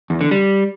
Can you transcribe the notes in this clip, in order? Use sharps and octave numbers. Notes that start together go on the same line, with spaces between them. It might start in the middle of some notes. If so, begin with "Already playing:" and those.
E2
D3
G3